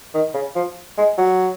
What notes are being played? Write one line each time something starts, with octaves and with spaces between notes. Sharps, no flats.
D#3
C#3
F3
G#3
F#3